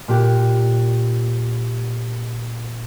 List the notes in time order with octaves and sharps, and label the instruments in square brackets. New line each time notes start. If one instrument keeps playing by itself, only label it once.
[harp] A#2 G4 F#6